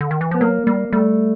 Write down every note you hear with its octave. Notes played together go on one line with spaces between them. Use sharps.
D3
D#3
E3
F3 B3
F#3 A#3
G3 A#3
G3 A3